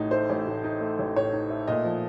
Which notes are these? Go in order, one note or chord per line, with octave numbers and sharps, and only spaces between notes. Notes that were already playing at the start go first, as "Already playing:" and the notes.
Already playing: A1 A2 D#4
A3 C5
A1
A2
D#4
A3
A1
A2 C#5
D#4
A3
A#2 D#5
F3